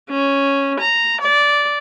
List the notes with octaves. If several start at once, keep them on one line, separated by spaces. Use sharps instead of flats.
C#4
A#5
D5